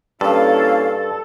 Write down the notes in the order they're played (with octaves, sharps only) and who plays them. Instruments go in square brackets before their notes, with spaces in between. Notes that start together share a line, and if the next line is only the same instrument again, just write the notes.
[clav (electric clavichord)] G2 [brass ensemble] A#3 C#4 E4 [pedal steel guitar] A4 [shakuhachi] F5